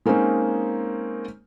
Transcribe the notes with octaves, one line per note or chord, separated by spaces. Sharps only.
G#3 A#3 C4 C#4 D#4